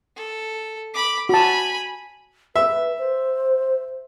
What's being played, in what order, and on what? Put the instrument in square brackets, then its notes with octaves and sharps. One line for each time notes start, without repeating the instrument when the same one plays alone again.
[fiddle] A4
B5 D6
[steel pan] F#4 A5 [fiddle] G#5 B5
[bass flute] B4 [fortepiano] E5
[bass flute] C5